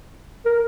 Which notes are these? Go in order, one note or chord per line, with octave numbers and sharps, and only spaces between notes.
A#4